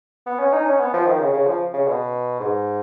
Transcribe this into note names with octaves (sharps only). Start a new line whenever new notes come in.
B3
C#4
D#4
C#4
B3
F3
D#3
C#3
C#3
F3
C#3
B2
G#2